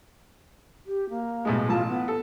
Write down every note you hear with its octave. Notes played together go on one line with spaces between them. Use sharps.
G4
A#3
B1 A2 G#3
A1 F4 A5
B3
A4